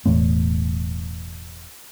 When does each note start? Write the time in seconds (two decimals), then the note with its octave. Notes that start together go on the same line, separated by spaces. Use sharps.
0.06 E1 E2 A2 B3